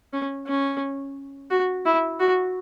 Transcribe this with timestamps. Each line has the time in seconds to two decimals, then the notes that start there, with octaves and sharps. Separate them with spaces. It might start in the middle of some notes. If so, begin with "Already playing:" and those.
0.13 C#4
0.48 C#4
1.51 F#4
1.86 E4
2.20 F#4